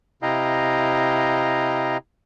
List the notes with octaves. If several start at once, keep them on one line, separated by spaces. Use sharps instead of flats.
C3 E4 D#5 F5 G5 A#5